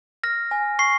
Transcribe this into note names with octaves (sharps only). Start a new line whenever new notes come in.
F6 A#6
G#5
C#6 C7